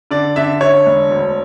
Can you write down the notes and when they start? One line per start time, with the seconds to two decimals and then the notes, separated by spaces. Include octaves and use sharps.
0.11 D3 D5
0.36 D3 E5
0.61 D3 C#5
0.86 E1
1.11 D2